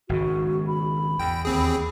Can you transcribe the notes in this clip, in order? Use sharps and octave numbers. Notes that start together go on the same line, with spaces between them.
G#1 G#2 C#3 F#4
B5
E2 G5
D#2 C4 G#4